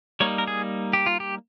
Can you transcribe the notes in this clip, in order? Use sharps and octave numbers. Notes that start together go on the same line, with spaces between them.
G3 A#3 D#4 C#5
A#4
G#4
G4
F4
G4